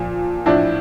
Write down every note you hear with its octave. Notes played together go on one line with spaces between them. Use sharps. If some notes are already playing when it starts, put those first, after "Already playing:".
Already playing: A#2 F3
A2 F3 D4 E4